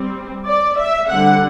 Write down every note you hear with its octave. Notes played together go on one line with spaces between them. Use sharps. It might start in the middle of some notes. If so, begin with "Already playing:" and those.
Already playing: G3 C4
D5
E5
D3 G3 C4 F#5